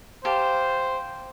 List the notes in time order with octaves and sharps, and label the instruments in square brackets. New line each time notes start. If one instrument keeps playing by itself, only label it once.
[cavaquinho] G4 F5 A5 [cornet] C5